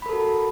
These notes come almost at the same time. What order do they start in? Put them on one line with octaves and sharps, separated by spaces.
B5 A#4 A4 F#4